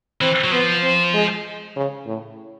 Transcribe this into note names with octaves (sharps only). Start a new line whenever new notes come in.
E3 C4
F#3
F3 B3
C4
G#3
C#3
A2